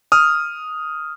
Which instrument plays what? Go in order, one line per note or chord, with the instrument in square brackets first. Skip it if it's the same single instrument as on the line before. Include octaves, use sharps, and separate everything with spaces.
[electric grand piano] D#6 F6